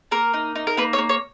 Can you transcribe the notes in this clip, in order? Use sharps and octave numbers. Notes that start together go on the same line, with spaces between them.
A#3 A#4
D#4
D#4
A#4
A#3 B4
C#5
A#3
C#5